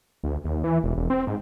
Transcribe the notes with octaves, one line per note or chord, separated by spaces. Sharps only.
D2
D#2
E3
E1
E1
C4
G#2